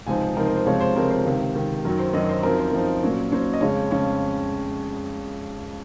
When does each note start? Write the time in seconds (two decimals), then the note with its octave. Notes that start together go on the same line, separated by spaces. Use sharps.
0.07 C#2 C3 F3 C4 D#4 G#5
0.36 C#2 C3 F3 C4 D#4 A#4
0.46 C5
0.56 C5
0.66 C#2 C3 F3 G#3 C4 C#5
0.80 C5
0.95 C#2 C3 F3 G#3 C4 A#4
1.11 C5
1.25 C#2 C3 D#3
1.55 C#2 C3 D#3
1.85 F#2 D#3 F#3 A#4
1.99 C5
2.13 F#2 D#3 F#3 D#5
2.29 C5
2.43 F#2 F3 C4 D#4 A#4
2.59 C5
2.73 F#2 F3 C4 D#4
3.03 A#2 F#3 C#4
3.32 A#2 F#3 C#4 C5
3.53 D#5
3.61 F2 C#3 G#3 C#4 C#5
3.91 F2 C#3 G#3 C#4